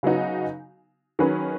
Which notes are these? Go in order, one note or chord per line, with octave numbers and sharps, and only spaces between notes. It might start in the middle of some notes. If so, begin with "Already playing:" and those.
C#3 F#3 B3 D#4 F#4
D#3 F#3 C#4 G#4 B4